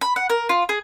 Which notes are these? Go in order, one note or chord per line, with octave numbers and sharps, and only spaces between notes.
B5
F#5
A#4
F4
G#4